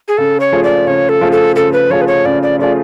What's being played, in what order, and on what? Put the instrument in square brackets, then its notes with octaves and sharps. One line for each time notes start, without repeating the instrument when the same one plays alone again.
[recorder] G#4
[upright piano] C#3 [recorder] A4
[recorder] C#5
[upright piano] F3 A3 F4 G#4
[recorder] D5
[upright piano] C#3 [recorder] C#5
[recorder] A4
[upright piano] F3 A3 F4 G#4
[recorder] A4
[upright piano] C#3 [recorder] A4
[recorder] B4
[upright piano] F3 A3 F4 G#4 [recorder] C#5
[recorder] B4
C#5
[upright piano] C#3 [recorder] D5
[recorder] D5
[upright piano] F3 A3 F4 G#4 [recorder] D5